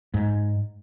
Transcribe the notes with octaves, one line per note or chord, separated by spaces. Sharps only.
G#2